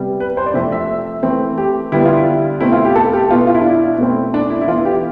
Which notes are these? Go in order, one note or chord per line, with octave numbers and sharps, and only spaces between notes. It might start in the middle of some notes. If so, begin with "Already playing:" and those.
Already playing: C3 G3 B3
B4
C5
D5
C3 F3 A3 C4 E5
E5
E3 A3 C4
G4
D3 G3 B3 E4
F4
E4
B2 A3 C4 E4
F4
G4
A4
G4
B2 B3 F4
F4
E4
D4
E4
B2 A3 C4
D4
E4
E4
E3 B3 F4
G4